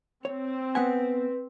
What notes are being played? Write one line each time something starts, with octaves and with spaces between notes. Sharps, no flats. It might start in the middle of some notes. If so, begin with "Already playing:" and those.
C4 C#5
B3 B4 F#5 G#5